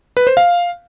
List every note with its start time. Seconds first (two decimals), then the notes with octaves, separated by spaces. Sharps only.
0.17 B4
0.27 C5
0.37 F5